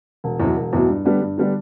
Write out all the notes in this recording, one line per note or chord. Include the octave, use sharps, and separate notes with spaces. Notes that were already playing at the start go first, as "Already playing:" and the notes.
E1
E2 B2 F#3
E1
E2 B2 F#3
G2
D3 G3 B3 D4
G2
D3 G3 B3 D4